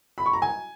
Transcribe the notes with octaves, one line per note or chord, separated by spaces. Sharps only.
B5
C#6
A#5
G#5